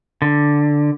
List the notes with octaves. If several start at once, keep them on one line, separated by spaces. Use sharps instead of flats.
D3